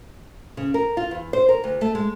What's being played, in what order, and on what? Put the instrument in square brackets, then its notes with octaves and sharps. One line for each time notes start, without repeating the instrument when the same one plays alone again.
[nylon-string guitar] C#3
A#4
F4
E2
C5
A#4
D2
A3
G#3